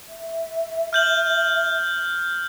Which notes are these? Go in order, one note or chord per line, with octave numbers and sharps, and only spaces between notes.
E5
F6 G6 F#7